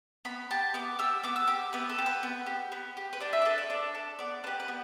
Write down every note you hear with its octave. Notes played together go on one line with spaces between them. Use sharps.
B3 B5
G4 A5
B3 D6
G4 E6
B3 D6
E6
G4 D6
B3 B4
A4
G4
B4
B3
G4
B3
G4
B4
D4 D5
E5
D5
A4 B4
D5
D4 D5
A4
B3 D5
D4 G4 B4
B4
B3